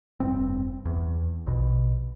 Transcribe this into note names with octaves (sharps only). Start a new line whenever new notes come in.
F1 G2 C4
E2
A#1 B2